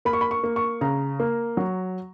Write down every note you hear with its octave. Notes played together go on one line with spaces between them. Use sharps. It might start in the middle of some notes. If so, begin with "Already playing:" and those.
A#3 B5
C#6
B5
C#6
A#3
C#6
C#3 A#5
A#3
F#3